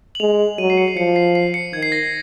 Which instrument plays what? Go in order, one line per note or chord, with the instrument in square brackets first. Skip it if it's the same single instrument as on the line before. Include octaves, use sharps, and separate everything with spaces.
[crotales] F#7
[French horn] G#3 [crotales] F7
[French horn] F#3 [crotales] D#7
[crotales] C7
C#7
C7
[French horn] F3 [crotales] C#7
[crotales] C7
C7
C#7
[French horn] D#3 [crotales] G#6
[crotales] C7
A#6